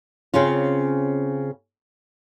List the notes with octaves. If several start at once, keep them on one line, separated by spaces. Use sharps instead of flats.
C#3 C4 C#4 F4